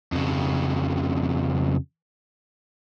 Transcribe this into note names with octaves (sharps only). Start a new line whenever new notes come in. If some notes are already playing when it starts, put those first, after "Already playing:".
F2 C#3